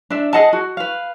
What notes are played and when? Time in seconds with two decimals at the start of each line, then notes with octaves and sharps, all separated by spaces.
0.10 D4 E5
0.33 G#4 D#5 F#5 A5
0.53 F#4
0.77 B4 F5